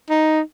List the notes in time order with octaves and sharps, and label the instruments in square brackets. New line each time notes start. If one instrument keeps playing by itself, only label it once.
[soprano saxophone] D#4